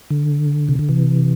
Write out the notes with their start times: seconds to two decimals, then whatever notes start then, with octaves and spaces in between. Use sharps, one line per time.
0.10 D3
0.69 C3
0.79 D3
0.89 C3 E3